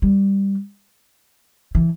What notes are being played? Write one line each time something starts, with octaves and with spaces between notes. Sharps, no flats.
G3
E3